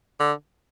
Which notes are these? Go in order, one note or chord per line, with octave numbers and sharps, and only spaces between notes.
D3